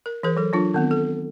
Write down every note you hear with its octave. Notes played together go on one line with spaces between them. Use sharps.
A#4
E3 G#4 A#4 C5
F#3 A4
F#3 D4 F4
D#3 B3 C4
A4